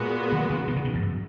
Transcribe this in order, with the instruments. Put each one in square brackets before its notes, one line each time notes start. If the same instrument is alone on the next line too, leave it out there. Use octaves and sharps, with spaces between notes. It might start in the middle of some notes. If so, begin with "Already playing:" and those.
Already playing: [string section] A#2 G#3 B3 F#4
[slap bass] D#3 F#3
C#3 E3
B2 D#3
C#3 E3
B2 D#3
E2 G#2
F#2